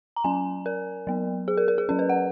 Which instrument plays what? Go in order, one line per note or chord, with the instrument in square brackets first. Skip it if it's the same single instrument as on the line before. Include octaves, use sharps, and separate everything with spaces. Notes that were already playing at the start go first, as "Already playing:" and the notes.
[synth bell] A#5
F#3 C#4 G#5
A#4
F#3 B3
G#4
A#4
A#4
G#4
F#3 C#4 A#4
B4
F#5